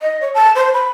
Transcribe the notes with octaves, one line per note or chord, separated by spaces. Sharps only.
D#5
C#5
A5
C5
B5